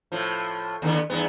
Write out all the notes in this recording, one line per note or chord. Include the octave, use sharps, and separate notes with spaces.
A2 F3
D#2 D3 B3
E2 G2 B3